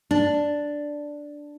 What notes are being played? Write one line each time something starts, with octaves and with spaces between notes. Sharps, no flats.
D4